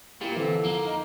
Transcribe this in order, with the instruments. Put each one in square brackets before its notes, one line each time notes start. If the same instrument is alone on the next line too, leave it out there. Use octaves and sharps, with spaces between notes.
[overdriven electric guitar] A#2 [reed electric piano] A#3 E4 G4
[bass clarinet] D3 [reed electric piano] E3 C4 [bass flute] A4
[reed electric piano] F2 [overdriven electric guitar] A#3
[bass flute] D#4